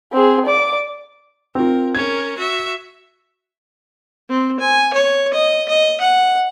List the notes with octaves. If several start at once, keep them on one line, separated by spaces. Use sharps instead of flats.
C4 G#4
D5 D6
C4 F4 A#4
C#4 A#4 G#6
F#4 E5
C4
G#5
C#5
D#5
D#5
F#5